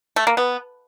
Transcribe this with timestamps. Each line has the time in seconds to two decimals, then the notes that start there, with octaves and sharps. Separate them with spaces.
0.16 A3
0.27 A#3
0.37 B3